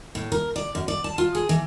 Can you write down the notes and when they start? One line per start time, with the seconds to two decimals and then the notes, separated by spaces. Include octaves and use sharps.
0.15 A2
0.32 A#4
0.56 D5
0.75 F#2
0.88 D5
1.04 A5
1.18 F4
1.35 G#4
1.49 E3